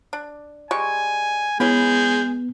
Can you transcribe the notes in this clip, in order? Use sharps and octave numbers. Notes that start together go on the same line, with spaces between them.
D4
G3 G#3 G#5 C#6
G#3 B3 C#4 E4 B4 G6